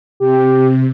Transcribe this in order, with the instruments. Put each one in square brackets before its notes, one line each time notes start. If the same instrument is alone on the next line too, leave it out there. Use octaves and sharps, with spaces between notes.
[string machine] C3 [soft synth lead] G4